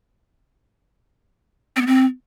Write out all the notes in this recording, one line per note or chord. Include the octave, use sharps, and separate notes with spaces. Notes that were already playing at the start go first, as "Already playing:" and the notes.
C4
B3
C4